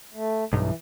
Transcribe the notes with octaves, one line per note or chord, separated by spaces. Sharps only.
A3
B1 G2 E3